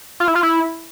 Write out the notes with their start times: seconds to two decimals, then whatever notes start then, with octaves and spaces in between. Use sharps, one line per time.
0.20 F4
0.28 E4
0.35 F4
0.43 E4